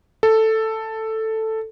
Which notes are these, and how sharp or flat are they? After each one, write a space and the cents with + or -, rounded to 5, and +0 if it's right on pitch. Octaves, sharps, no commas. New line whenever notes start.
A4 +5